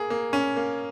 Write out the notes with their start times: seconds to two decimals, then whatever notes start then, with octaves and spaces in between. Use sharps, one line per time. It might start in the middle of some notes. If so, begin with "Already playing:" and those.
Already playing: A#3 G#4
0.10 A#3
0.33 C#4
0.56 A#3